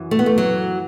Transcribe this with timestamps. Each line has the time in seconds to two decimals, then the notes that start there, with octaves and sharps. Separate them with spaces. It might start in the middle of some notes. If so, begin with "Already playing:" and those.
Already playing: F#2 E3
0.11 A3
0.19 B3
0.26 A3
0.38 F#3